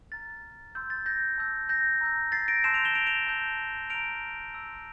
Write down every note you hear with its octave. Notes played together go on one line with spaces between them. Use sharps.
A#5 F6 A6
C6 E6 G6
A6
G6 A#6
A5 E6 G6
G6 A#6
A#5 E6 G6
A6 C7
A#6 D7
A5 C6 E6 G6 C7 E7
D7 F7
E7 G7
D7 F7
D7 F7
A5 E6 G6
A#5 F6 D7 F7
C6 E6 G6